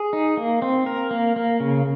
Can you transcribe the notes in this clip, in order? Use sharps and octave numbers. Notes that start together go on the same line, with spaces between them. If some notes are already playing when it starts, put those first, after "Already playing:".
Already playing: G#4
D#4
A#3
C4
A#4
A#3
A#3
C#3